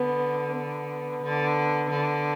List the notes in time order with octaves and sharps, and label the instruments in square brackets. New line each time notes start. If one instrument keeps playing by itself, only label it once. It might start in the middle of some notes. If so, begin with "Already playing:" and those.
Already playing: [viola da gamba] D3 [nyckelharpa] B3
[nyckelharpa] B3
[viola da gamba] D3
D3